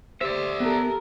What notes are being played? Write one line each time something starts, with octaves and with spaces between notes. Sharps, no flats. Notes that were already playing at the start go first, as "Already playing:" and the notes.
G4 C5 D5 E5
B3 A4 A#4